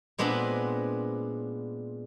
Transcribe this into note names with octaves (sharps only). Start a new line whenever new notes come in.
A#2 G#3 B3 C4 D4 B5